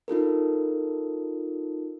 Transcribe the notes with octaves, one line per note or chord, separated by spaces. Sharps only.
D#4 F4 A4 A#4